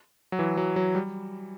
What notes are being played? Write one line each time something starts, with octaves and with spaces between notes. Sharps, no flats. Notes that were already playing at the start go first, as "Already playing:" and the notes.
F#3
E3
F#3
F#3
G3